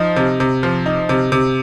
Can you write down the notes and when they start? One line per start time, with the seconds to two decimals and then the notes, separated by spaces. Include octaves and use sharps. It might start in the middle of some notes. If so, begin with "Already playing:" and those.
Already playing: F3 D#4
0.16 C3
0.40 C3
0.63 F3
0.86 D#4
1.09 C3
1.32 C3